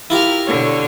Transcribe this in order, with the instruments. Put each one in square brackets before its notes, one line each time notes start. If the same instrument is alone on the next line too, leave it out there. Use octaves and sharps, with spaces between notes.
[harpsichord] E4 F4 G4 [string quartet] A#4 F6
[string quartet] B2 D3 C#5